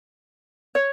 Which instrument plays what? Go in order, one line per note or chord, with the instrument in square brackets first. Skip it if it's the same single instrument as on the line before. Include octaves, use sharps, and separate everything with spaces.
[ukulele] C#5